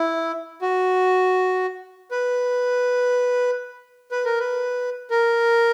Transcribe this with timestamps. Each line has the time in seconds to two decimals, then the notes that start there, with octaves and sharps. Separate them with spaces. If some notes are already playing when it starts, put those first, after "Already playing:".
Already playing: E4
0.62 F#4
2.11 B4
4.11 B4
4.25 A#4
4.39 B4
5.11 A#4